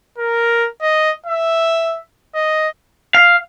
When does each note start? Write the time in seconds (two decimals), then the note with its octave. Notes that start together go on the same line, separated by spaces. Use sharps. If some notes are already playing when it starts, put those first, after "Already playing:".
0.18 A#4
0.82 D#5
1.26 E5
2.35 D#5
3.15 F5